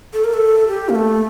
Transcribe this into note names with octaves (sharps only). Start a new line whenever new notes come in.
A4
A#4
A4
G4
A#3
A3